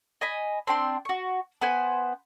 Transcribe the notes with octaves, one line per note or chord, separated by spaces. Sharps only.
D#5 G#5 B5
C4 D4 G5 C6
F#4 C#6
B3 B4 C5 G#5